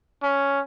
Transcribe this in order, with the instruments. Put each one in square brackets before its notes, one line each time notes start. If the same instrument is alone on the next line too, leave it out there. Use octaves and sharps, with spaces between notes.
[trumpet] C#4